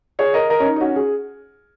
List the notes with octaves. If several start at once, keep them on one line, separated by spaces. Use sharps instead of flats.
G#4 C#5
A#4 D#5
A#4 D#5
C#4
D#4
D#4
C#4 F#4
G#4